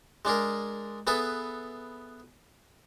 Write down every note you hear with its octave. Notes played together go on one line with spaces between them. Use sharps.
G#3 D4 G#4 A#4
B3 G#4 A4 B4 E5